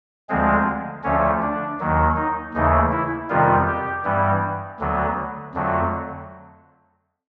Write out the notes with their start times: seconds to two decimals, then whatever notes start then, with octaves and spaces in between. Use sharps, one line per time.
0.29 D2 D3 F3 G#3 C4
1.04 D2 D3 F3 A3 C#4
1.42 D4
1.80 D#2 D#3 F#3
2.16 D#4
2.54 D#2 C#3 E3 A3 D#4
2.92 E4
3.29 F2 C3 D#3 G3 B3 F4
3.67 G4
4.04 G2 E3 G3 B3
4.80 D2 D3 F#3 B3
5.54 F2 D3 F#3 A3